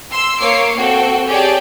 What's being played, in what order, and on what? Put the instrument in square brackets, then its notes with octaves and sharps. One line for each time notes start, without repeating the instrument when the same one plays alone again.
[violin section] C6 E6
A#3 C#5 D6 C7
C4 F#4 A4 G5
G4 G#4 C#5 D5 G5 A5